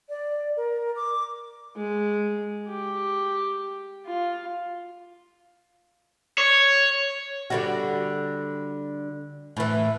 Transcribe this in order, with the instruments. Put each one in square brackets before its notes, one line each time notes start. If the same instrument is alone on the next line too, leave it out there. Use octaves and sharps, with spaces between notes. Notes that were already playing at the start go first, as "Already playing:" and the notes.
[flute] D5
A#4
D6
[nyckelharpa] G#3
G4
F4
[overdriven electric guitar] C#5
[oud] D3 G3 F#4
A2 E3